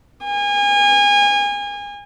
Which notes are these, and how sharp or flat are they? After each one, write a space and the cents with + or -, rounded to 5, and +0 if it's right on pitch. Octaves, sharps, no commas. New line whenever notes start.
G#5 -30